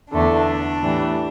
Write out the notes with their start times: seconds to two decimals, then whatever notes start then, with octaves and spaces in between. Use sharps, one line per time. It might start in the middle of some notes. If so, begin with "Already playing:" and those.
0.13 E2 D3 A3 D4
0.81 A2 E3 G3